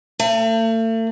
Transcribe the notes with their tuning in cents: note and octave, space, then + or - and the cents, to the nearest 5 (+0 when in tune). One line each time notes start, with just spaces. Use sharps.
A3 +40